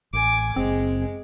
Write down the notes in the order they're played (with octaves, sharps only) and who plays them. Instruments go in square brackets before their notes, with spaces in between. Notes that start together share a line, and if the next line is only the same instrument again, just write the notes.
[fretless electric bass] A1 [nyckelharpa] G#5 D6
[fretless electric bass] F#1 [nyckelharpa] G#3 [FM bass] C4